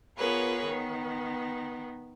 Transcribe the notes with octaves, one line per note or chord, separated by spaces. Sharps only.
B3 F4 G#4 A#4 B4 C#5
D#3 B3